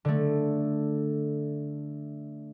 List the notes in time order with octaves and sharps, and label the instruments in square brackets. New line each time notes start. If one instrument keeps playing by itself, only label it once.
[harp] D3 A3